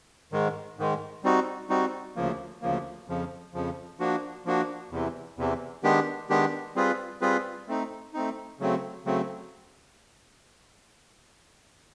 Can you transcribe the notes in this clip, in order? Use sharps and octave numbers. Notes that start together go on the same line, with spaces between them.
G#2 D#3 G#3
G#2 D#3 G#3
G3 C4 D#4 F#4
G3 C4 D#4 F#4
D2 C#3 F3 A#3
D2 C#3 F3 A#3
F2 C#3 F3
F2 C#3 F3
F3 A#3 D4 F#4
F3 A#3 D4 F#4
E2 C3 E3
E2 C3 E3
D#3 G#3 B3 D4 G4
D#3 G#3 B3 D4 G4
G3 C4 F4 G#4 B4
G3 C4 F4 G#4 B4
A3 C4 D#4
A3 C4 D#4
C#3 F#3 A3 C4
C#3 F#3 A3 C4